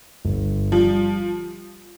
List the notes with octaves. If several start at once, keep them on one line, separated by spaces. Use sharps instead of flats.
G1
F3 G3